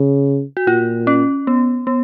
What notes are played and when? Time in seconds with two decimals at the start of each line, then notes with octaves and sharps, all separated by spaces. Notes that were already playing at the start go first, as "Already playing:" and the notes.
Already playing: C#3
0.57 F#4
0.67 A#2 F4
1.07 C#4
1.47 B3
1.87 B3